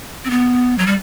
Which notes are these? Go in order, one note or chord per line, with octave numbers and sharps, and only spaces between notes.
C4
B3
F#3
G3